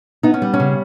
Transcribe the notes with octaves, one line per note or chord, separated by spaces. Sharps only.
B3 D#4
C#4
G3
C#4
C#3